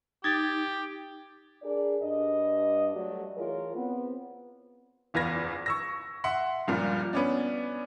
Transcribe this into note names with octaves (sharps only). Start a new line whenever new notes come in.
D#4 G4 G#6 A6
D4 G#4 A#4 D5
G2 D4 D#5
F#3 G3 A3 F#4 A4 D5
E3 F4 G#4 A#4 C#5
B3 C4
F#1 E2 F4 B4 G#6 A#6
C#6 E6 A#6
E5 F#5 C6
C#2 G2 A#2 F3
B3 C#4 D4